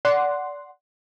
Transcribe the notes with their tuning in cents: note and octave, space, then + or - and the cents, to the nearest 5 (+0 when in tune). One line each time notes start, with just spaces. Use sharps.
D5 -20 F#5 +0 C6 +0